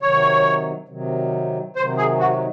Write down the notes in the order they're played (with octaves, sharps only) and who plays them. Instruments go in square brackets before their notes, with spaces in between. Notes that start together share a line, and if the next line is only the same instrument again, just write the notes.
[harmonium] C3 D#3 F#3 [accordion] C#5
[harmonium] C3 D#3 F#3
[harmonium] C3 D#3 F#3 [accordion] C5
[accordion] G#4
F#4